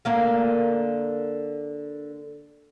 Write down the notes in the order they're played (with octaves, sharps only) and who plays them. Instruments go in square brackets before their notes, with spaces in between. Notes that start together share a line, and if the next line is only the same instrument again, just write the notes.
[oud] D3 A#3 F5